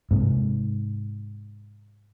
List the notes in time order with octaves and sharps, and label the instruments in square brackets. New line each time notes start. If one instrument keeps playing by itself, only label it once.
[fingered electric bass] G#2 C3